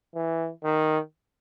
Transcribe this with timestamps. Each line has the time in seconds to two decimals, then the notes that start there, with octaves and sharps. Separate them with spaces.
0.15 E3
0.64 D#3